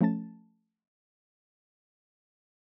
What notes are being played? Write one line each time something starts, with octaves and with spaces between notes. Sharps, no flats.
F3 A3 C#4 A5 A6